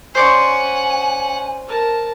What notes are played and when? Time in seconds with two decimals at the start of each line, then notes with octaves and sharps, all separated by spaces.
0.15 C#4 C5 D5 F#5 G#5 C#6
1.67 A#4 A5